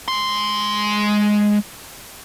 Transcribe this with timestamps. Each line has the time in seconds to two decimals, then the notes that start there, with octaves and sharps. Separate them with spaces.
0.08 G#3 C6